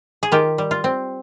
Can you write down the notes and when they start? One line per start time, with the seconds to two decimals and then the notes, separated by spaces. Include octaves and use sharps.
0.23 G#4
0.32 D#3 F4 G4
0.58 G3
0.71 F4
0.84 C4